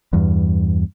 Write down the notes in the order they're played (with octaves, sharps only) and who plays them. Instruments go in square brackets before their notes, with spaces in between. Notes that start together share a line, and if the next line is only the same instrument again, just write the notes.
[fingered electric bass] E2 G2